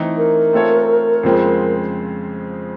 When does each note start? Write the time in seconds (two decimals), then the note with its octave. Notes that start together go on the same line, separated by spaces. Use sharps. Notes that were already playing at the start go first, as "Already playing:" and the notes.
Already playing: E3 A3 C4 D#4
0.17 A#4
0.53 A3 C4 F4 A4 C#5
1.23 F2 C#3 F3 G#3 C4